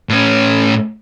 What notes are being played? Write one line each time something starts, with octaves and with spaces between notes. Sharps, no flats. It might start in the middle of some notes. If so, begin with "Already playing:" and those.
A2 C#4